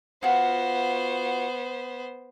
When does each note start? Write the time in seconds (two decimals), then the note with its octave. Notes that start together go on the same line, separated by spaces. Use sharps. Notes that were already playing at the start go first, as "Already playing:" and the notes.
0.23 B3 F4 F#4 C5